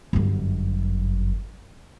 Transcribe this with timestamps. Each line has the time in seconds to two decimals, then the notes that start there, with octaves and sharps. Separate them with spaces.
0.13 G1 F#2